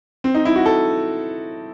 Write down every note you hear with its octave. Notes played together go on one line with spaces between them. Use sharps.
C4
D#4
E4
F#4
A4